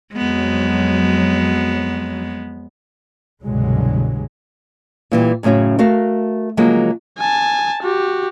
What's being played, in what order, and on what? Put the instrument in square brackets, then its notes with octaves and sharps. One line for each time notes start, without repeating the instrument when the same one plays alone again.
[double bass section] F2 F#3 [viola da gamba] G#3 B3
[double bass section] C2 G2 B2 D3 F#3 G#3
[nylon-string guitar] A#2 E3 G3
F#2 A2 C#3 C#4 F#4
A3 F#4 A#4 F5
C#3 F3 F#3 G#3 A#3
[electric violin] G#5 A5
F#4 G4